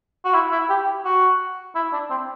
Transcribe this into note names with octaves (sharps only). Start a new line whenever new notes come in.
F#4
E4
E4
G4
F#4
E4
D4
C4